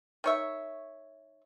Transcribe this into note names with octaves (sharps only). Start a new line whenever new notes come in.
D#3 C#5 E5